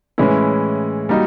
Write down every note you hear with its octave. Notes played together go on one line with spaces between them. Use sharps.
A2 E3 G#3 C#4 E4
G3 A#3 D#4 F#4